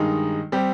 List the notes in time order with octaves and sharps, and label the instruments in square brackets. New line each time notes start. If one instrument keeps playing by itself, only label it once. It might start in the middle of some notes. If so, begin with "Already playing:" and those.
Already playing: [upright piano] G2 D#3 G#3 D#4
G3 C4 G4